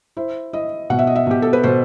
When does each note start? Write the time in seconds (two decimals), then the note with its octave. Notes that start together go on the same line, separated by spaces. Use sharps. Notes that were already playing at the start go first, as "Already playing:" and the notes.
0.17 E4 C5
0.53 E4 D#5
0.90 B2 F#5
0.99 E5
1.07 D#5
1.16 E5
1.27 B2 G4
1.42 A4
1.53 B4
1.63 B2 C5